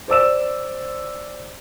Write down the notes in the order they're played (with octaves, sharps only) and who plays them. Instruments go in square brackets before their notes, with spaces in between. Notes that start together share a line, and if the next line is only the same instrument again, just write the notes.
[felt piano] C5 D5 E6 E7